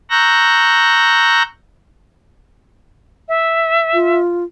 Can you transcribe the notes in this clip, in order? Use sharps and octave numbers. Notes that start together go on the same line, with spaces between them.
A#5 C#6 E6 F#6 G6 A#6
E5
F4